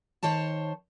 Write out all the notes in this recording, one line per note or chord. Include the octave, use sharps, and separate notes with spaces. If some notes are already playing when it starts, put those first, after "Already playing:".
D#3 C5 C#5 A5